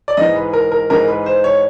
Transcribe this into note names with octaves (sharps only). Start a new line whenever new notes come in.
D5
G#2 E3 G#3 B3 D#5
B4
A#4
A#4
G#2 E3 G#3 B3 A#4
B4
C5
C#5